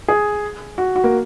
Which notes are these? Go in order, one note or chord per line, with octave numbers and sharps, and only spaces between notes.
G#4
F#4
F#4
A#3